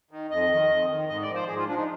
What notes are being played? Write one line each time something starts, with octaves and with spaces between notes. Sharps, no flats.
D#3
F2 D#5
D#3
F2
D#3
G#2 D#5
D5
F3
C5
G#2 G#4
F4
F3 D4
D#4